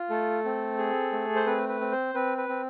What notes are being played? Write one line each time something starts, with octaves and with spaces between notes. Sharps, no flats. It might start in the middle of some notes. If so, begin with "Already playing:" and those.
Already playing: F4
A3 A4
C4
G#4
A3
C5
C4 B4
B4
C4
C5
C4 B4
B4
C4